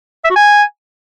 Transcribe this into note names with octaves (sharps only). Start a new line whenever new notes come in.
E5
F#4
G#5